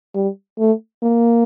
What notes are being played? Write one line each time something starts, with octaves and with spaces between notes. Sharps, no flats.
G3
A3
A#3